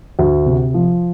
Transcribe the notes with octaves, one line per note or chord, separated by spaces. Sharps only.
D2
C3
F3